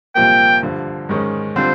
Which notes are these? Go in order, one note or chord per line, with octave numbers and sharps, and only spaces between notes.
C2 A#2 F3 A#3 G5
G2 D3 F3
G#2 D#3 G#3 C#4
D3 G3 C4 F4 C5